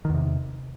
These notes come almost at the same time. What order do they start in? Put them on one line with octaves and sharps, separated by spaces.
D#3 E2 C3